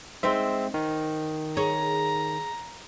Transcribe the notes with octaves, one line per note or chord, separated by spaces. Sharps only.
G#3 C4 D#4 C5 E5
D#3
G#4 C#5 A#5